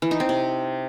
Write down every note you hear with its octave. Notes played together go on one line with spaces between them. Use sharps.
E3
D#4
C4
C3